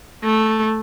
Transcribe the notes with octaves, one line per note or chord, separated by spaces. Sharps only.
A3